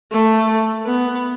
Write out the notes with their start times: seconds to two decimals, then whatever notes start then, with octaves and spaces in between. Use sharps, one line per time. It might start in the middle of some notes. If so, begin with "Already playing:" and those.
0.12 A3
0.86 B3